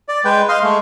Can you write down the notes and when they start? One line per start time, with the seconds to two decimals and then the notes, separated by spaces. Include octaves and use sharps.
0.08 D5
0.25 G#3 B4 G5
0.49 D#5 F5 C6
0.63 G#3 A3